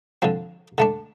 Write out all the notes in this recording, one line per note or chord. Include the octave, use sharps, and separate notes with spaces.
D3 F3 C4
D3 A3 D4